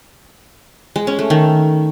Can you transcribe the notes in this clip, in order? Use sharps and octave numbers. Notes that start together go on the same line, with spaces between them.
G#3
C#4
A3
D#3